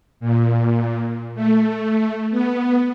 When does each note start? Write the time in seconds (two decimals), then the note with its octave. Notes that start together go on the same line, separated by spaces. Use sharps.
0.20 A#2
1.35 A3
2.30 B3